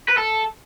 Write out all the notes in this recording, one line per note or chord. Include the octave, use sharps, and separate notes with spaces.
B4
A4